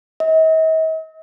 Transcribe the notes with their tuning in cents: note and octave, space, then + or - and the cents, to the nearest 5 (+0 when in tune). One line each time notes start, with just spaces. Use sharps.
D#5 +45